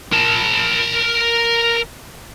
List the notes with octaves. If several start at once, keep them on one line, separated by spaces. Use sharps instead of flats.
A#4 A5